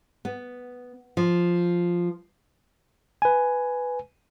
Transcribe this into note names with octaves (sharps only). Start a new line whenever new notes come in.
B3
F3
B4 G#5